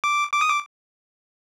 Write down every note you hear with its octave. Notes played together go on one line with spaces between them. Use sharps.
D6
D6
D#6
D6